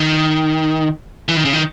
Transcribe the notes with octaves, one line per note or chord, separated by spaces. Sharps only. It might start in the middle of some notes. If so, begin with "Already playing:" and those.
Already playing: D#3
E3
D#3
C#3
D#3